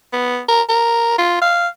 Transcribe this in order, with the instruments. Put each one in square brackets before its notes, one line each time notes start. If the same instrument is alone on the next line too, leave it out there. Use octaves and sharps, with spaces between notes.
[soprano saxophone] B3
A#4
A#4
F4
F5